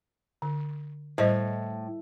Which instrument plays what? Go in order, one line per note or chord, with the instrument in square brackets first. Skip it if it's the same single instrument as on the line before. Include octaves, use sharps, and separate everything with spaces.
[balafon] D3
[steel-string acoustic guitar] A2 [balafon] G3 C5 D#5